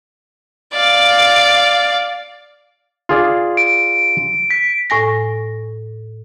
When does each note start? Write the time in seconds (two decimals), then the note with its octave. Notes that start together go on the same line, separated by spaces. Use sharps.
0.73 D5 F5
3.09 F4 G#4 D5
3.57 D7
4.50 B6
4.90 A2 G#5 A#6